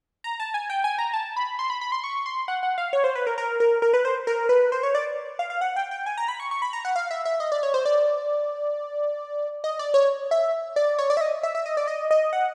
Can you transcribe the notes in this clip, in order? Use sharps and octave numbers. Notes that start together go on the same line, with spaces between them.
A#5
A5
G#5
G5
G#5
A#5
A5
B5
C6
B5
B5
C6
C#6
C6
F#5
F#5
F5
C#5
C5
B4
A#4
A#4
A#4
A#4
B4
C5
A#4
B4
C5
C#5
D5
F5
F5
F#5
G5
G5
G#5
A#5
B5
C#6
C#6
B5
A#5
F#5
F5
E5
E5
D#5
D5
C#5
C5
D5
D#5
D5
C#5
E5
D5
C#5
D5
E5
D#5
E5
E5
D#5
D5
D#5
D#5
F#5